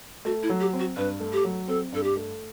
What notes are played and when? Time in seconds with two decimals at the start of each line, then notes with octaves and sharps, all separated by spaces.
0.25 A3 F#4
0.43 E4
0.50 F#3
0.60 G4
0.73 C4
0.79 F#4
0.97 G2 B4
1.20 A3
1.33 G4
1.44 F#3
1.68 C4 A4
1.92 G2 A4
2.03 G4
2.16 A3